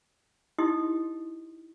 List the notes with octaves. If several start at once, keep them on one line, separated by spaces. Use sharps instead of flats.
D#4 E4 G4 D#5 C6 D#6